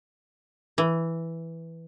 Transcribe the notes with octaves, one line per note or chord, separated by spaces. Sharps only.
E3